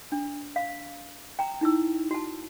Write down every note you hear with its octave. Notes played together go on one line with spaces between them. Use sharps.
D4
F5
G5 A#5
D#4 E4 E6
F#4 A5